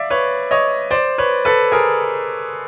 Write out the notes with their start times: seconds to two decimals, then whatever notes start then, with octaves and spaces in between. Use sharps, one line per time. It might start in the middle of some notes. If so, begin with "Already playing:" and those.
Already playing: D5 E5 F5
0.10 B4 C#5
0.51 C#5 D#5
0.91 C5 D5
1.18 B4 C#5
1.45 A4 B4
1.72 G#4 A#4